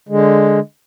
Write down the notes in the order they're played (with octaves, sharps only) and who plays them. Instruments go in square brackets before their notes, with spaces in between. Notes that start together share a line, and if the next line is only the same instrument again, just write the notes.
[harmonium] D3 G#3